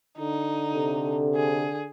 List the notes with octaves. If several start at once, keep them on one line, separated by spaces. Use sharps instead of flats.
D3 D#4
C3 A4
G#4